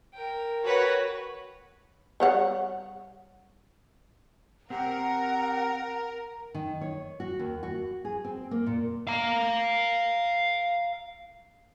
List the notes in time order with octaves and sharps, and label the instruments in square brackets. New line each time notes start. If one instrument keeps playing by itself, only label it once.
[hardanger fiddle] A#4 G5
[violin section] F#4 B4 C#5
[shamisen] G3 C#5 F#5
[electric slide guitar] C4 G4 [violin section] A#4 [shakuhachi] F#5
[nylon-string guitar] D#3
C#5
F#4
D#2
F#4
G#4
C4
A#3
A#2
[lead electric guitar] F5 A#5